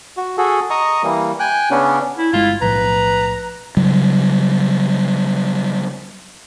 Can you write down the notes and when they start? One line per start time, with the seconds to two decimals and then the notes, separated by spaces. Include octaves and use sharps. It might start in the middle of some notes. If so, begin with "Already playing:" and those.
0.17 F#4
0.38 F#4 G#4 A4
0.70 D#5 A#5 C#6 D#6
1.03 E3 G3 A#3
1.40 G5 G#5 F#6
1.71 C#3 B3 C#4 D4
2.18 E4
2.33 G1 G#3 E4 F4
2.62 B1 A2 F3 B4 A#5
3.77 C#3 F#3 G3